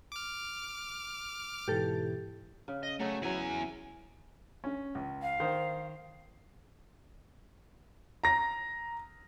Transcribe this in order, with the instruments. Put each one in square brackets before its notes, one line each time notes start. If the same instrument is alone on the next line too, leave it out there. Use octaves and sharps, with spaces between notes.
[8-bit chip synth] D6 F6
[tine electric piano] G#2 B2 E3 [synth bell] G4 A4
[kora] C#3
[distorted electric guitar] D#5
[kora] F#3 F#4 G#4 [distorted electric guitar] A3
[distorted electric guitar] E2 G#5 [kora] E3 F#3
[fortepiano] C#4
C#2
[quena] F5
[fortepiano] D#3 C5
[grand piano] A#5 A#6